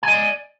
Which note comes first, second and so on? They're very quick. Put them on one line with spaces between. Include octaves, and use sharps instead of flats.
G#5 D#5 D5